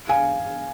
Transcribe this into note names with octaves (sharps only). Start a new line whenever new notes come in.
F5 G#5